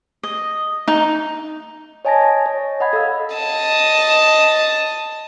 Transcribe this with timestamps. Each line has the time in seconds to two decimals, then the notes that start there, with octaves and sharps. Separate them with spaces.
0.23 D#5
0.88 D#4
2.05 C#5 D#5 G#5 A5 G#6 A#6
2.21 D#5
2.46 C#5
2.80 D#5 F#5 B5 G#6
2.93 A4 D#5 F5 E6
3.35 D#5 A5